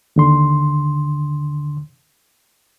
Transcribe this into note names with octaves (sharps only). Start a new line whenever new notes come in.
D#2 D3 C6